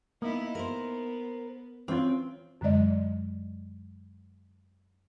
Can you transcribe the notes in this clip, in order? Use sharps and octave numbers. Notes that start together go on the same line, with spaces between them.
A#3 B3 D#4 E4
B3 A#4 C5
E3 C4 C#4 F4
F#2 D3 F#3 G#3 D5 D#5